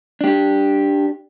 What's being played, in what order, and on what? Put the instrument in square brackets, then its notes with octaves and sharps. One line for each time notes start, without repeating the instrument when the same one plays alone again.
[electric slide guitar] D4 G4